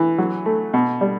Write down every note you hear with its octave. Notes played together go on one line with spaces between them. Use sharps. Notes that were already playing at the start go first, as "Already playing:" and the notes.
Already playing: E3
F#3
A3
B2
G3